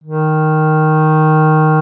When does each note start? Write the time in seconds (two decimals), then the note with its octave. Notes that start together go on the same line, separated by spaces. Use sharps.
0.03 D#3